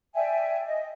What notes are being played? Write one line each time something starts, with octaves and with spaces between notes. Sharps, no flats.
D5 E5 G5 G#5
D#5